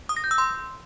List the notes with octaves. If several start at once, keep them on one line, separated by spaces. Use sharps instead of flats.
D#6
A#6
G6
E6
C6